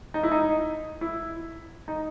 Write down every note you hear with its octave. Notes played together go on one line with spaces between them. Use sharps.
D#4
E4
D#4
E4
D#4